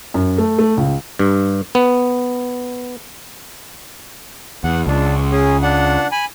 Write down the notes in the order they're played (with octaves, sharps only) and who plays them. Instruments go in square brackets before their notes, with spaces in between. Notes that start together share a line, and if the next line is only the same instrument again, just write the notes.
[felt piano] F#2
A3
A3
C#2
[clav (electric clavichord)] G2
B3
[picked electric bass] E2 [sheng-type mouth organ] F#5
[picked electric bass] C#2 [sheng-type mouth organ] D4
[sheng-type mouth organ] C#4 G#4
D4 F#5
G#5 B5